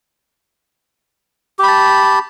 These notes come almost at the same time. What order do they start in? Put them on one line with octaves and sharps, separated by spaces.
G4 B5 A5